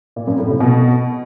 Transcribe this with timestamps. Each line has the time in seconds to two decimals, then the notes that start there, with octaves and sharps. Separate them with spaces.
0.16 A#2
0.27 F#2
0.38 A2
0.49 C3
0.60 B2